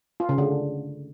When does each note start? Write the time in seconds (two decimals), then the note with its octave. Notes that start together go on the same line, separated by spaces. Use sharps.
0.20 F4
0.29 C#3
0.38 D3